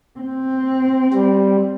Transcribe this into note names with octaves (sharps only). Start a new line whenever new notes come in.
C4
G3